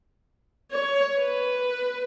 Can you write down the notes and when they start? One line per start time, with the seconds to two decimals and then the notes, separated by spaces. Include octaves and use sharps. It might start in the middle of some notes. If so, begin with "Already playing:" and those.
0.72 C#5
1.19 B4